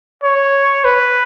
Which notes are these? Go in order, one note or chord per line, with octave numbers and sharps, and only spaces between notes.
C#5
B4